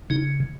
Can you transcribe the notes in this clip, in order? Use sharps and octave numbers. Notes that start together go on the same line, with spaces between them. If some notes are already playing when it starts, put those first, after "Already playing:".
C#3 D#4